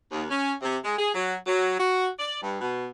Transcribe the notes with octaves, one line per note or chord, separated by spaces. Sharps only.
D#2
C#4
C3
G#3
G#4
F#3
F#3
F#4
D5
G2
B2